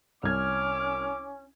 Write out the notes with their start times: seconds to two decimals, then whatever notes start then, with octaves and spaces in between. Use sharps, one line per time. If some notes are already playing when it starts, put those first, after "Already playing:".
0.23 C2 C#4 D6 F6 G#6